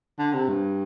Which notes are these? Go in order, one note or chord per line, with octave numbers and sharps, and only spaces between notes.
D3
C3
G2